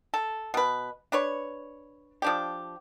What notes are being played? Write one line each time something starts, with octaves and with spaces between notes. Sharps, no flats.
A4
B2 B4
D4 B4 C#5
F3 D4 G4